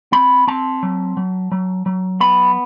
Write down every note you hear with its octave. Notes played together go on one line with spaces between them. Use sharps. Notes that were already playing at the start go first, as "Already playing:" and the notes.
C4 B5
C4 A5
F#3
F#3
F#3
F#3
B3 B5